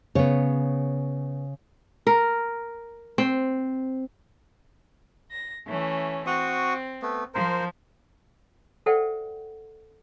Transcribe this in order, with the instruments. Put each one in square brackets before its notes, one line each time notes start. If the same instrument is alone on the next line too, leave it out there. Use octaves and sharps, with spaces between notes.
[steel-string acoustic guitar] C#3 [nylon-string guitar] B3 C#5
[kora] A#4
C4
[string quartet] A#6
E3 A3 C#4
[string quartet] C4 [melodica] F#4 C#6 D#6
[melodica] A3 B3
[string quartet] F3 [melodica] A#4 C5
[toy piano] A4 C5 D5 E5 F#5 G5